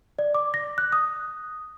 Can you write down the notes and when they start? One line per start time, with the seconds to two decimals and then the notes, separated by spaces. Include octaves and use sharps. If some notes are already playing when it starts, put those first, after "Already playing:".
0.19 D5
0.34 D6
0.54 A#6
0.78 F#6
0.92 D#6